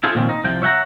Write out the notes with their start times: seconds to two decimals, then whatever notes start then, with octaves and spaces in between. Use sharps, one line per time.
0.03 E4 F4 G#4 A4 C5
0.15 A#2 D#3 F3 C4 C#4
0.29 D#4
0.44 C2 C3 F3 G5
0.62 C#5 E5 F#5 G5 A#5